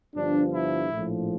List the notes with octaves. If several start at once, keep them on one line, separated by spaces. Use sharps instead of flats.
G1 G2 F3 D4
E4
A#1 A2 F3